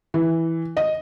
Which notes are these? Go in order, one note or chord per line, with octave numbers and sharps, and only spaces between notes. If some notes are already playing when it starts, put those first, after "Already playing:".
E3
D#5